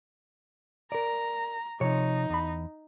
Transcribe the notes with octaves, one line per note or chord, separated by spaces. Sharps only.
A#4 D5 A#5
C3 F3 D#4 C#5
E2 B5